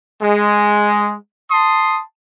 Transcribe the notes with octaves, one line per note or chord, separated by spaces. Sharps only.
G#3
A5 C6 D#6